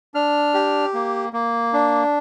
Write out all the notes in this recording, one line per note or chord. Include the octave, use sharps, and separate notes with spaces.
D4 F6
G4
A#3
A#3
D4